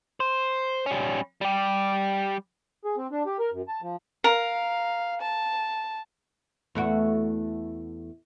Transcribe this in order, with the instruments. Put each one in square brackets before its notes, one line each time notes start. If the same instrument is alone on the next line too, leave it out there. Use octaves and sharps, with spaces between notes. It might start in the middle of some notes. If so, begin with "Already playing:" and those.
[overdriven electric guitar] C5
G3 C#4
G3 G4
[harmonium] G#4
C4
D4
G4
A#4
F#2
A5
F3
[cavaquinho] A#4 [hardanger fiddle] F5
[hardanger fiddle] A5
[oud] E2 A3 F#4